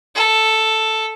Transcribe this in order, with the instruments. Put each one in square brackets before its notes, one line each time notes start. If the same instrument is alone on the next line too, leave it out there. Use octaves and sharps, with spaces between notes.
[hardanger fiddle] A4